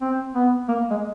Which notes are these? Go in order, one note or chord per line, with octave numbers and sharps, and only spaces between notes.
C4
B3
A#3
G#3